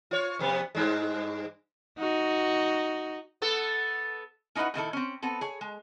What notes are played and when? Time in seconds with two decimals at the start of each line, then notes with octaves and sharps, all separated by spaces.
0.11 F4 C#5
0.39 F2 C3 B3
0.75 G2 G#3
1.99 D#4 F#4
3.42 B3 A4
4.55 C#4 D#4 E4 F#4 B4 F#5
4.74 A#2 D#3 E4 A4
4.93 C4 C#4
5.22 B3 C4 A4
5.41 G#4 C#5
5.61 G#3